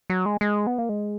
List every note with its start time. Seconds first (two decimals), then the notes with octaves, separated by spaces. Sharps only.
0.10 F#3
0.26 G#3
0.41 G#3
0.67 B3
0.78 A#3
0.89 G#3